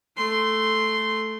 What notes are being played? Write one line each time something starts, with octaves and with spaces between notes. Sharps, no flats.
A3 C6